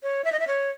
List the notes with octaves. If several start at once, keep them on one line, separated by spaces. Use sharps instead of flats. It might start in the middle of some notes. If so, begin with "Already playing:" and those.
C#5
E5
D#5
E5
C#5